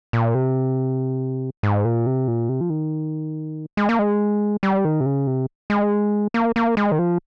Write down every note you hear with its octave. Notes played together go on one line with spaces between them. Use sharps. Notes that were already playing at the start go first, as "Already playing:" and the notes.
A#2
C3
G#2
A#2
C3
A#2
C3
F3
D#3
G#3
A#3
G#3
G3
D#3
C3
C#3
C3
G#3
A#3
A#3
G#3
D#3
F3